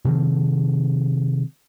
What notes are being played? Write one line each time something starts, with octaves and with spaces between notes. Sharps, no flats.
C3 D#3 F3 C4